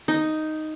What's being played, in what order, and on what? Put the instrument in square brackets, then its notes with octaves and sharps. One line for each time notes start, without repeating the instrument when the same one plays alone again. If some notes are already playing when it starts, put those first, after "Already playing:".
[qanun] D#4